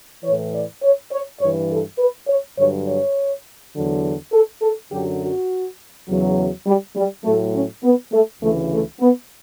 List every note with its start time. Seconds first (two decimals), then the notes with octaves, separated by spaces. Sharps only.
0.23 E3 C#5
0.28 A2
0.53 D5
0.82 C#5
1.12 C#5
1.40 G2 E3 C#5
1.70 A4
1.99 B4
2.28 C#5
2.57 G2 D3 F#3 C#5
2.87 C#5
3.74 E2 D3 F#3
4.33 A4
4.62 A4
4.91 F#2 D3 F#3 G4
5.21 F#4
6.08 E2 C#3 F#3
6.66 G3
6.96 G3
7.25 A2 F#3 A3
7.54 C#4
7.83 B3
8.12 A3
8.41 D2 C#3 E3 A3
8.71 A3
9.00 B3